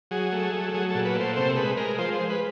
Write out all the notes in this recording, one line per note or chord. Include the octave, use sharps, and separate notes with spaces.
F#3 G#4
A3
G#4
F#3
F#3 G#4
A#2 A4
B4
A3
C5
C3 C5
G#3 B4
G#3 A#4
F3 C5
G#3 C5
B4